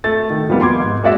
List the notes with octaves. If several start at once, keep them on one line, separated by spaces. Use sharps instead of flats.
A3 A6
D#3
F3 G3 A#3 B3 D#4
C6 D6 G#6
G#2
G#3 A#3 F#4 D5 E5